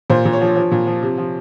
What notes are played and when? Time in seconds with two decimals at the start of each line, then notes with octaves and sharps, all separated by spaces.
0.10 A#2 C5
0.25 A#2
0.33 C#5
0.41 F3
0.56 F3
0.72 A#2
0.87 F3
1.03 C3
1.18 F3